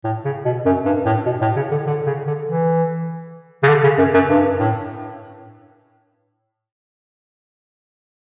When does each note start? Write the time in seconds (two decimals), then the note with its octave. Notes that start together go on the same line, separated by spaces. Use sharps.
0.04 A2
0.25 C#3
0.45 B2
0.65 F#2
0.85 G2
1.05 A2
1.26 B2
1.41 A2
1.56 C#3
1.71 D3
1.87 D3
2.06 C#3
2.27 D3
2.47 E3
3.63 C#3
3.68 D3
3.84 C#3
3.98 F#2
4.14 F#2
4.29 G2
4.59 A2